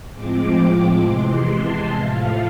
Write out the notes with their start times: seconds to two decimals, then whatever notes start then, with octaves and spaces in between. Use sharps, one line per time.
0.13 A2 F3 G#3 C4 D6
1.04 E2 C3 E3 G#3 C6
1.50 A5
1.95 A2 F3 A3 F5